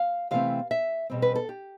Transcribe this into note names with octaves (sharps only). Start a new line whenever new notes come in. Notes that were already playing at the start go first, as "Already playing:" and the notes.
Already playing: F5
C3 E3 A3 C4 F5
E5
E2 B2 G3 C4
B4
A4
G4